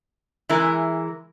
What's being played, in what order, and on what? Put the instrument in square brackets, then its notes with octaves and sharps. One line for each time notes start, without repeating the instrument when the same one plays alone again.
[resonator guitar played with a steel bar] E3 G#3 E4 A#4